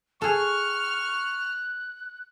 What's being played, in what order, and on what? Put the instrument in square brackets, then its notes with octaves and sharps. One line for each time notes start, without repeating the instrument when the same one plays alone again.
[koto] G#4 A4 [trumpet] C#6 [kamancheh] F6 [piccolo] F#6